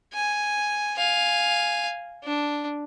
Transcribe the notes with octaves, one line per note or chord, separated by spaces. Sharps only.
G#5
F5 G#5
D4